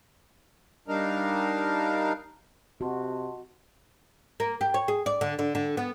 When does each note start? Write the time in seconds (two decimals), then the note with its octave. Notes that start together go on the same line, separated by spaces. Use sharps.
0.88 G3 D4 D#4 A#4 F5
2.81 C3 F#4 D#5 A5 C6
4.40 A#3
4.61 G4
4.74 C#5
4.88 G#4
5.06 D5
5.21 D3
5.39 D3
5.55 D3
5.77 B3